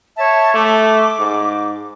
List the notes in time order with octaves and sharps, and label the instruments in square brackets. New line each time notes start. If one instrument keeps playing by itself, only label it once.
[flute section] C#5 E5 A5
[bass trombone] A3 [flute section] D6
[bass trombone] G#2